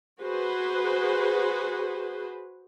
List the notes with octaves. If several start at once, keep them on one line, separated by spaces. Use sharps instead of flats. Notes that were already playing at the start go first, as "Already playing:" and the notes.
F#4 G#4 B4 C5